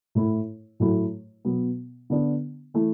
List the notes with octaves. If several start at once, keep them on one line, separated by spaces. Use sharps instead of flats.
A2 A3 E4
A2 F#3 A3 E4
B2 F#3 B3
D3 B3 D4
E3 A3 E4